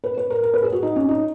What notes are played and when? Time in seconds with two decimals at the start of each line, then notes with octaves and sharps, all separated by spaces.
0.04 B4
0.18 B4
0.30 A#4
0.43 A#4
0.54 B4
0.63 G#4
0.72 F#4
0.83 D#4
0.96 C#4
1.09 D#4